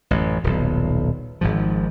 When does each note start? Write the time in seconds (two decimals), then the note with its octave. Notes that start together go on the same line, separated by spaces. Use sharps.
0.11 A1 F#2
0.44 D#1 B1
1.41 G#1 G#2 F3